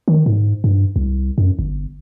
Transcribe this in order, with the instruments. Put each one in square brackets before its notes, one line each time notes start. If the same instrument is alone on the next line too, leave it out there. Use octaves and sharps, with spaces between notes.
[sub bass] D#3
G#2
G2
C2
F#2
G1